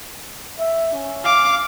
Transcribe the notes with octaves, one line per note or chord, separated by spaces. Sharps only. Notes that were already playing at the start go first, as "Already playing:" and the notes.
E5
C#4
F5 D6